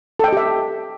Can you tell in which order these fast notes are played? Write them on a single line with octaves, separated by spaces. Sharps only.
A4 G5 D#5 G4 E5